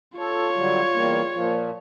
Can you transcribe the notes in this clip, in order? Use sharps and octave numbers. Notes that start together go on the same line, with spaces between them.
F4 A4 C#5
D3 F#3 G3
E2 G3 A#3
A#2 F3